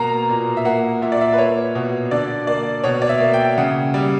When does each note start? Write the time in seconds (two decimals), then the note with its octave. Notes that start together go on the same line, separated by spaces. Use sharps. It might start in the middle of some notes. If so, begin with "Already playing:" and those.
Already playing: B2 A#3 A#5
0.29 A#2
0.57 E5
0.65 A#3 F#5
1.02 A#2 E5
1.12 D5
1.21 E5
1.33 B4
1.38 A#3 C#5
1.75 B2
2.11 D3 D5
2.47 A#3 D5
2.84 B2 C#5
3.02 D5
3.09 E5
3.20 A#3
3.33 G5
3.58 C#3 F#5
3.94 G3